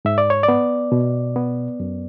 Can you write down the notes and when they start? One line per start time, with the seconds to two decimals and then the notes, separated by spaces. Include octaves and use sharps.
0.05 G#2 E5
0.18 D5
0.30 C#5
0.43 D5
0.48 B3
0.92 B2
1.36 B3
1.80 F#2